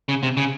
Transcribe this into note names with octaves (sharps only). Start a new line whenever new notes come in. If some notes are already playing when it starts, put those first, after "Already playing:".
C#3
C3
C#3